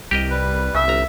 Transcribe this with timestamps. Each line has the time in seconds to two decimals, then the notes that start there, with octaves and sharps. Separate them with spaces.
0.11 C2 G4 A#4 D#5
0.30 G3 B4
0.75 C2 C#3 E5
0.88 G1 A#5